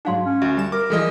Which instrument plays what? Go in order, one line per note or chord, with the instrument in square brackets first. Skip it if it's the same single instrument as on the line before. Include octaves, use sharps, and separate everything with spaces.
[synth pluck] G#2 F#3 D4 [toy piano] D#4 F5 C6
[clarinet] C#4
[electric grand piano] D2 [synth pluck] F#4 [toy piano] E5
[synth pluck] G3 E7
[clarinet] A#4 [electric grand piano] D6
[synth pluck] E3 F3 E4 [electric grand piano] G3 G#3 D#5 [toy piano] A4